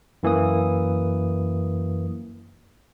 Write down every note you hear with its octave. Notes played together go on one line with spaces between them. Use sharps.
F#2 E3 A#3 D#6